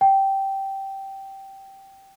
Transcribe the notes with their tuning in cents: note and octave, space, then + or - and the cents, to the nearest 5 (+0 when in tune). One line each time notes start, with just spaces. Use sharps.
G5 -10